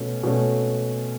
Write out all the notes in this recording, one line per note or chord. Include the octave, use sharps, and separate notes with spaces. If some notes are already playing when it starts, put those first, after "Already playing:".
Already playing: B2 A3 C#4
B2 A3 C#4